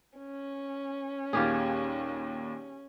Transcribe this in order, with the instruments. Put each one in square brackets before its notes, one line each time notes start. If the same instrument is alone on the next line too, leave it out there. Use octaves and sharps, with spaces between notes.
[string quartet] C#4
[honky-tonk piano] D#2 A#2 [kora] F4 G4 G#4